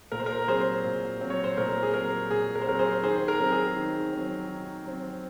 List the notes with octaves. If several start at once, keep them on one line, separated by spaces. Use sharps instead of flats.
A#2 A#4
C5
A#4
F#3 C4 G#4 C5
A#2
F#3 C4
C#5
C5
A#2 A#4
G#4
F#3 C4 A#4
A#2 G#4
A#4
C5
F#3 C4 A#4
G#4 C5
D#3 G#4 C5
A#4
F#3 C4
G#4
D#3
F#3 C4
D#3
F#3 C4